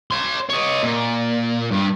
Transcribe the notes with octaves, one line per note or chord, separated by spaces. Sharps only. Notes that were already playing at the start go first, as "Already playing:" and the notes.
C#5 C6
C#5 D#5
A#2
G2